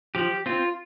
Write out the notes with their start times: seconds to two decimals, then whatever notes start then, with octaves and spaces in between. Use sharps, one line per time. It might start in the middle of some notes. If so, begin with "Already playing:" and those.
0.15 F3 G4
0.46 C4 F4